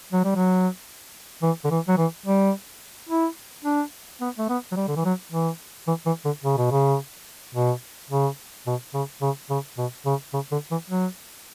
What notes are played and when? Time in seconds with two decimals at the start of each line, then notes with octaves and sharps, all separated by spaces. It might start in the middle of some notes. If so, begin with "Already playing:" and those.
0.12 F#3
0.24 G3
0.36 F#3
1.42 E3
1.64 D3
1.71 E3
1.88 F#3
1.98 E3
2.26 G3
3.09 E4
3.65 D4
4.21 B3
4.38 A3
4.49 B3
4.72 F#3
4.76 G3
4.88 D3
4.96 E3
5.05 F#3
5.32 E3
5.87 E3
6.06 E3
6.25 D3
6.44 C#3
6.57 B2
6.71 C#3
7.55 B2
8.10 C#3
8.67 B2
8.94 C#3
9.22 C#3
9.50 C#3
9.78 B2
10.06 C#3
10.33 C#3
10.52 D3
10.71 E3
10.89 F#3